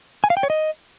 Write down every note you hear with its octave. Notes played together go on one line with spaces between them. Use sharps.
G#5
F5
G5
C#5
D#5